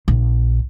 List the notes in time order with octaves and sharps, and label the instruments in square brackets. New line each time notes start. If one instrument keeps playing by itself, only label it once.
[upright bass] A#1